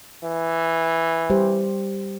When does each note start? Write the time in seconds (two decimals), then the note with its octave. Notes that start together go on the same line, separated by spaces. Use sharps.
0.24 E3
1.30 G3 G4 C5